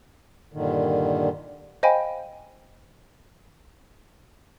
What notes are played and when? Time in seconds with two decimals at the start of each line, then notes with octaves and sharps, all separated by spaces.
0.53 G2 A#2 D3 D#3
1.83 C5 D#5 F5 G5 G#5 B5